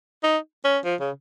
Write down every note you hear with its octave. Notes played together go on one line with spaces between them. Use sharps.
D#4
C#4
F3
C#3